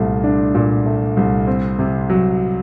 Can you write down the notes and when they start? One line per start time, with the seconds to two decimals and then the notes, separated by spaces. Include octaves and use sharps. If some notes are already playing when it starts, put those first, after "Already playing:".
Already playing: C2 A#2 A3
0.24 D4
0.55 A#2
0.86 A3
1.17 C2
1.47 C4
1.79 C3
2.10 F#3